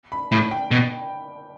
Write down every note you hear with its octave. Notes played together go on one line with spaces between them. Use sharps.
B5
A2 B5
G5
B2